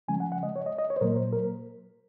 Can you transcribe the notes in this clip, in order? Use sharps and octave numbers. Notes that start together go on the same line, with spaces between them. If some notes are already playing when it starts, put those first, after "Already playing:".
C#3 F3 G#3 C#4 G#5
F#5
F#5
D#5
C#5
D#5
D#5
C#5
C5
A#2 F#3 A#3 A#4
C5
A#4